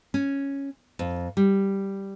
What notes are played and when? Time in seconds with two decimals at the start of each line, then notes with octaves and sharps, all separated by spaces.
0.14 C#4
0.99 F2
1.37 G3